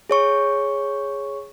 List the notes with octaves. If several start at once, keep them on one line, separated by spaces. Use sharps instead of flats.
G#4 C#5 C#6